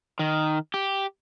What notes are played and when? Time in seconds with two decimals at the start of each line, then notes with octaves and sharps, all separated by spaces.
0.19 D#3
0.74 G4